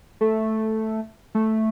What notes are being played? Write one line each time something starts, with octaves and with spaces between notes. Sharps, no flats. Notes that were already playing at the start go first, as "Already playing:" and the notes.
A3
A3